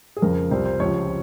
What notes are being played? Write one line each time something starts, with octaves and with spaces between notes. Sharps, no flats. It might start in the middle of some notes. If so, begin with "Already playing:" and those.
G#4
F2 C#3 F3 A#4
C2 C3 F3 C5
C5
C#2 C3 F3 C#5